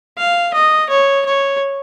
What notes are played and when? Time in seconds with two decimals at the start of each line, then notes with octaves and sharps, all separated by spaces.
0.18 F5
0.54 D#5
0.90 C#5
1.26 C#5